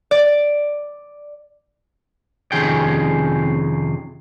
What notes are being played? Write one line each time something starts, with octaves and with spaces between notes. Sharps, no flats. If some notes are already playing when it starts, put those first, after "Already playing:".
D5
F2 C3 D#3 C#4 G#4 G5